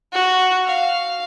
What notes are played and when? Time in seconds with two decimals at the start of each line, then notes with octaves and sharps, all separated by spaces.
0.13 F#4
0.66 F5